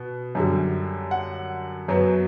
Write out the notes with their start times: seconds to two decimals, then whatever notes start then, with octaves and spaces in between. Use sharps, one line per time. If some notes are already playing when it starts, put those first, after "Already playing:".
Already playing: B2
0.35 F#2 D3 G3
1.11 F#5
1.88 F#2 F#3 B3